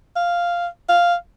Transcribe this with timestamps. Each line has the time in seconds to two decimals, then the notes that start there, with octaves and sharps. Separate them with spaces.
0.16 F5
0.89 F5